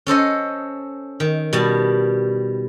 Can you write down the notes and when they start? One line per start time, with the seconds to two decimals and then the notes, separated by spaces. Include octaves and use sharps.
0.07 C#4 A4 C5 D#5
1.20 D#3
1.53 B2 G3 A5